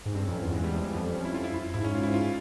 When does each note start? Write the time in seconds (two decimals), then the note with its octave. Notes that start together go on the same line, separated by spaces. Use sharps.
0.06 G#2
0.14 G2 C4
0.25 C#4
0.28 F2
0.35 E4
0.42 E2 F4
0.54 G#3
0.64 G3
0.74 F3
0.84 E3
0.94 F2 F3
1.04 G3
1.15 C#4
1.25 E4
1.35 F4
1.44 E4
1.54 E4
1.74 G#2 E4
1.84 C#4
1.95 F4
2.03 E4
2.14 F4